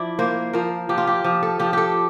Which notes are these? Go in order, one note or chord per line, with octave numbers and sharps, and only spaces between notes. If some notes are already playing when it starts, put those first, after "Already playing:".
Already playing: F3 E4 D5
A#3 C5
F3 A#4
F3 G4
F4
G4
F3
A4
F3 G4
G4 A4